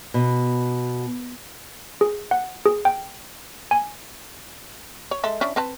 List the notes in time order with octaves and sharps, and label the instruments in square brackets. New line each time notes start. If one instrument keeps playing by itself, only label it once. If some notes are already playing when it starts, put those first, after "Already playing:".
[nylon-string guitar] B2
[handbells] G#4
F#5
G#4
G5
G#5
[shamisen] C#5
G#3 A4 E5
C#4 D4 E4
C4 B4 A5